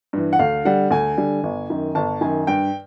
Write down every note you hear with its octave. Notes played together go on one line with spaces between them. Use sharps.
G2 E3
F#5
D2 F5
D3 G3 F#5
D2 G#5
D3 G3
G1
F#2 D#3
G1 A5
F#2 D#3 G#5
G2 G5